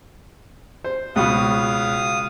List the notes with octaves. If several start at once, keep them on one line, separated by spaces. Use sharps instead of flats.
C5
C#2 B2 F5 D#6